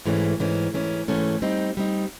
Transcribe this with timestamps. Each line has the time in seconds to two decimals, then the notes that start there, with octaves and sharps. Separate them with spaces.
0.05 G#2 E3 A3 C#4
0.40 G#2 E3 A3 C#4
0.73 G#2 E3 A3 C#4
1.08 G#2 E3 A3 C#4
1.42 G3 C4 D#4
1.77 G3 C4 D#4